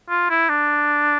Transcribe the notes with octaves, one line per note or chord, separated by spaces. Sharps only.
F4
E4
D4